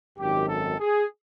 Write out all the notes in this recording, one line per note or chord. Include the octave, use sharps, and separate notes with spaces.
G#1 F#2 D#3 G4
A4
G#4